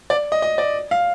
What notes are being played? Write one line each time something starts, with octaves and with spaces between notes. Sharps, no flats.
D5
D#5
D#5
D5
F5